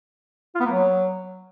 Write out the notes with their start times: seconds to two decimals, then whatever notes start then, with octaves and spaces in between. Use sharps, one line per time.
0.55 F4
0.60 B3
0.66 A#3
0.71 F#3